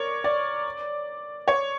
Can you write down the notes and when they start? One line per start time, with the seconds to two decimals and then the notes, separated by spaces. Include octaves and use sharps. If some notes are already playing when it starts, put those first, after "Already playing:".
Already playing: A#4 C#5 D5
0.24 D5
1.48 C#5